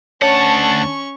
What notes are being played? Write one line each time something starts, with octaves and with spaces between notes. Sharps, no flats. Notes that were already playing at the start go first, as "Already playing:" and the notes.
D2 C#4 C#5 F#5 A5 C#6